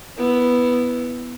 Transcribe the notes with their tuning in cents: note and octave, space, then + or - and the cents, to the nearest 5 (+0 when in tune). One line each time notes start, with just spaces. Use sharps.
B3 +0 E4 +0